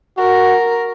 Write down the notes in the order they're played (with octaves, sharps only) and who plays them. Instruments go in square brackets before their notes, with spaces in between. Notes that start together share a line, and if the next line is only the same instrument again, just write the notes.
[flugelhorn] F#4 [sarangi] A#4